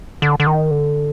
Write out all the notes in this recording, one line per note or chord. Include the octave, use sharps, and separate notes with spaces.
D3
D3
D#3
D3